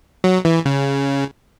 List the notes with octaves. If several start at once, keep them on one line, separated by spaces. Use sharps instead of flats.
F#3
E3
C#3